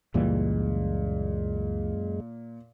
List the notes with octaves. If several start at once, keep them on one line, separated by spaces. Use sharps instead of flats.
C#2 F#2 A#2 E3 G3 G#3